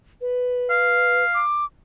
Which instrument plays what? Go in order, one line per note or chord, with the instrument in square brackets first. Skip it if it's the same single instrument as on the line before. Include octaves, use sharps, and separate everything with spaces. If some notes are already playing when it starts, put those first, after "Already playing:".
[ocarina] B4
[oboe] F5
[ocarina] D6